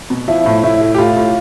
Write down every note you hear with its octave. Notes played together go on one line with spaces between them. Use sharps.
B2
F3 E4
A2
A2 E4
A3
G4
A2 F4
A2